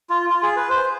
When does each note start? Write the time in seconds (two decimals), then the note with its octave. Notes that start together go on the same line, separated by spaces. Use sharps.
0.10 F4
0.30 F4
0.43 G#4
0.56 B4
0.70 C5